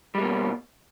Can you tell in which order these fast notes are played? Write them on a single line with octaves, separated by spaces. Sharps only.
G3 G#3 A#3 B2